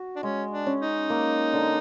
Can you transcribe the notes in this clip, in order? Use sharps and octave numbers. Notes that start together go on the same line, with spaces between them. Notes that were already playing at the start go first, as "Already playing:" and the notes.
Already playing: F#4
D4
G#3 C#4
D4
C#4
D#4
A#3
D3